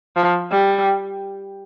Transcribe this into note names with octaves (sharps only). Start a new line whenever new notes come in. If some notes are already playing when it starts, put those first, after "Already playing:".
F3
G3